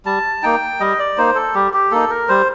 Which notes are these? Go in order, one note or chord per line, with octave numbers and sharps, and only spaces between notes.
G3 A5
A#3 D#4 G5
G3 D#5
D5
A#3 D#4 C5
A4
G3 G4
G4
A#3 D#4 A4
A#4
G3 C5